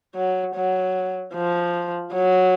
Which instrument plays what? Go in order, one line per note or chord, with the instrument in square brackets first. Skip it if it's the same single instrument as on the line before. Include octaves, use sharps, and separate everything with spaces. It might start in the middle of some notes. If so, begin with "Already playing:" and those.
[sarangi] F#3
F#3
F3
F#3